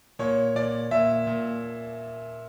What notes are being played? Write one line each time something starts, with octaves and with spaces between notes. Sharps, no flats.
A#2 C#5
A#2 D5
A#2 E5
A#2